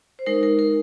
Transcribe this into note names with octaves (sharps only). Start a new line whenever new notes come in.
C5
G#3 D#4 A#4
A#4
A#4